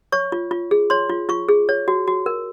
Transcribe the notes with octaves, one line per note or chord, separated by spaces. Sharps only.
C#5 C#6
F4
F4
G#4
C#5 C6
F4
F4 C#6
G#4
C#5
F#4
F#4
A#4